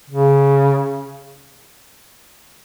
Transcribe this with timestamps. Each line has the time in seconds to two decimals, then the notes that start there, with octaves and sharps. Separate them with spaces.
0.10 C#3